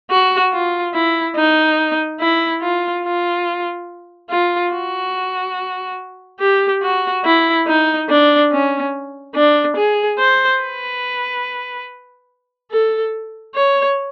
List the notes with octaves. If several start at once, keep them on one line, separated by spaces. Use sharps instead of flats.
F#4
F4
E4
D#4
E4
F4
F4
F4
F#4
G4
F#4
E4
D#4
D4
C#4
D4
G#4
C5
B4
A4
C#5